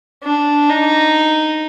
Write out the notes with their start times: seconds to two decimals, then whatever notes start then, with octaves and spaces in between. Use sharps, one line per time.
0.23 D4
0.69 D#4